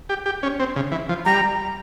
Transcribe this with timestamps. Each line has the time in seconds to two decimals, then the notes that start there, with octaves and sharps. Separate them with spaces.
0.09 G4
0.26 G4
0.43 C#4
0.59 C4
0.76 C#3
0.92 E3
1.09 F3
1.25 G3 A#5